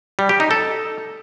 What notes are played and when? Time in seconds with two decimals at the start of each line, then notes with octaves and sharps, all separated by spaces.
0.19 G3
0.29 G4
0.40 D#4
0.51 A4